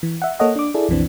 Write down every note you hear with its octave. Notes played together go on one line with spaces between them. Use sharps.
E3
E5 F#5
A#3 A4 C#5 D#5 F#5
D4 D6
E4 G#4 A4 D5
B1 F2 E3 C4 D4